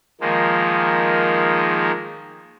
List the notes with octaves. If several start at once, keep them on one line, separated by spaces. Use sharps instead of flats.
D#3 F3 G#3 A#3